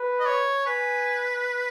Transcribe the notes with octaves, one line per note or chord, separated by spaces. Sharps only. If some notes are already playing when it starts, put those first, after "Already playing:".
Already playing: B4
D#5
C#5
B4 G#5